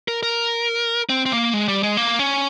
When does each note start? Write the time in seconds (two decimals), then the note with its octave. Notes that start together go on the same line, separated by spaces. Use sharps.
0.08 A#4
0.23 A#4
1.09 C4
1.26 C4
1.32 A#3
1.54 G#3
1.68 G3
1.83 G#3
1.97 A#3
2.19 C#4